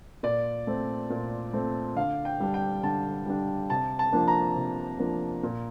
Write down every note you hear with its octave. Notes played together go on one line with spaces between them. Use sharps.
A#2 D5
A3 C4
A#2
A3 C4
D3 F5
G5
G3 D4
G5
D3 A5
G3 D4
C3 A5
A5
F3 A#3 D4
A#5
C3
F3 A#3 D4
A#2